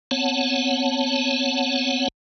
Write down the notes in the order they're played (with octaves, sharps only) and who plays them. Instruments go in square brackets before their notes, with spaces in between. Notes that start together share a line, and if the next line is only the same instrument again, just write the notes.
[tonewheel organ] B3 C4 C#5 F#5 A5